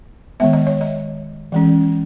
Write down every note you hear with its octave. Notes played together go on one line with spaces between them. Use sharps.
D#3 G#3 B3 E5
D#5
C#5
D#5
E3 G#3 C#4